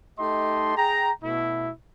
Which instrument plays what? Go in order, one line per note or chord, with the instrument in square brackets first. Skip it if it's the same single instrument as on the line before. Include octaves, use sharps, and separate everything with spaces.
[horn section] A3 D#4 G4 D#5 A5 C6
G#4 G5 A#5
B2 A3 E4